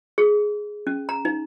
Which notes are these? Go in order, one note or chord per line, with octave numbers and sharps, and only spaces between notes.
G#4
C#4
A#5
D#4